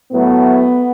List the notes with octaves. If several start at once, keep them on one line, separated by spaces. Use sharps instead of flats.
A2 F#3 A3 B3